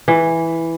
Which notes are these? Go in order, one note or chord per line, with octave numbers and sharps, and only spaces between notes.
E3